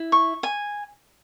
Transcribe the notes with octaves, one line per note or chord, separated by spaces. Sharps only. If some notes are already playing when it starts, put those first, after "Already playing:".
Already playing: E4
C#6
G#5